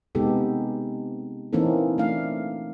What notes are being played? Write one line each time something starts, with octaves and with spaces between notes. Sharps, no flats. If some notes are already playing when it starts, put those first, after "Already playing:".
C3 G#3 B3 D#4 G4 A4
E3 A#3 C4 C#4 D#4 A4
A3 D4 F5